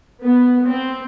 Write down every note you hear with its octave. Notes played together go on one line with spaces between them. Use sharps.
B3
C4